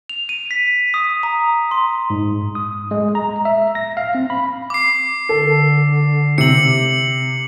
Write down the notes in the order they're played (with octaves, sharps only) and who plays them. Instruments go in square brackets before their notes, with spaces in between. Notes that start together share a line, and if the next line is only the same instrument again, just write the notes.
[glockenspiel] F7
D#7
B6
D#6
A#5
C6
[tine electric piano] G#2
D#6
G#3
A#5
E5
A#6
F5
C4
B5
[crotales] D6 C7
[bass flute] D3 [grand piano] A4
[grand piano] C3 [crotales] C#7 F#7